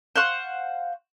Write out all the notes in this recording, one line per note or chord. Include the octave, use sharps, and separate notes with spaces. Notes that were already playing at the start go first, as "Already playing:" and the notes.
C5 F5 F#5 C#6